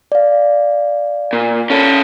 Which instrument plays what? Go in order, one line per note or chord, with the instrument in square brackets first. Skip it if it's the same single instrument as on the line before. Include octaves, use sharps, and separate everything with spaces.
[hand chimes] D5 F5
[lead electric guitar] A#2
C#4 A4